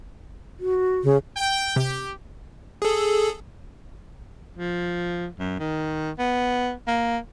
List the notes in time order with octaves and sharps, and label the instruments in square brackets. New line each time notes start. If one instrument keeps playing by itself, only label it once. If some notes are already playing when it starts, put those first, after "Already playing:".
[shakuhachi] F#4
[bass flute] C#3
[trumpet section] G5
[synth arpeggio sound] C3 [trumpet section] G4
[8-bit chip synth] G#4 A4
[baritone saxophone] F3
F#2
D#3
B3
A#3